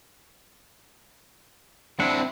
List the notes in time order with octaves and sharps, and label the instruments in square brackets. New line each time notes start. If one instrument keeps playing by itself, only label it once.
[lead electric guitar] C4 E4 [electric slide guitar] D4 F#5